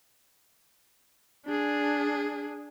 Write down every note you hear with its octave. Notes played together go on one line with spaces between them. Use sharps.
D4 G#4